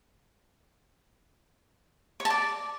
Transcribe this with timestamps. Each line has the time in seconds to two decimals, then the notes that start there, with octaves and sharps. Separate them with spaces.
2.20 C#5
2.25 A5
2.30 D5